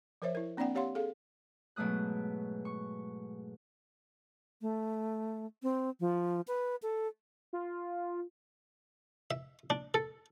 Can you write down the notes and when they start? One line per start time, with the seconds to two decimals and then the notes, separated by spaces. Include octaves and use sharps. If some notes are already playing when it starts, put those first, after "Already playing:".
0.22 F3 A#4 C5 C#5 E5
0.35 E4 A#4
0.57 A#3 C4 D4 D5 F#5 G5
0.75 C4 G4 C#5 F5 F#5 C6
0.95 G#4 A4 F5
1.76 G#2 B2 F#3 A3 D#6 F#6
2.65 C#6
4.62 A3
5.63 C4
6.00 F3
6.48 B4
6.82 A4
7.53 F4
9.31 E5
9.70 D4
9.94 A4